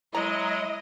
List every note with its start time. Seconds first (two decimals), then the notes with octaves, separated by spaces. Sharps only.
0.15 F#3 G#3 E4 D#5 A#5